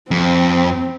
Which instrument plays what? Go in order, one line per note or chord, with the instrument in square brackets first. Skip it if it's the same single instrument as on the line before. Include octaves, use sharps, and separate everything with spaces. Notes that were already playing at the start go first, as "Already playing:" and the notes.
[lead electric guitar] F2 [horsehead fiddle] C4